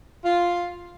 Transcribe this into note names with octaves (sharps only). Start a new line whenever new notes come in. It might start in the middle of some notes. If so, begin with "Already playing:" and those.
F4